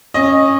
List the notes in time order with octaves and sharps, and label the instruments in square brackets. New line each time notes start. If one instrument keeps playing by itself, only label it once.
[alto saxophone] C#4 [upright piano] D#5